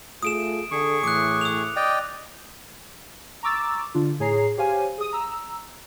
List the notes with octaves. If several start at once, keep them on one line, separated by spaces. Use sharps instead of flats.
A3 F4 G#4 D#6 D7 E7
D3 G#4 C#6
A2 E3 D6 F#6
D#6 F7
D5 D#5 G5
A#5 C#6 D6 E6 A6
D3 D4 F4
A2 G#4 C#5 A#5 C7
G4 C5 C#5 F5 G#5
G#4 D#6
A#5 E6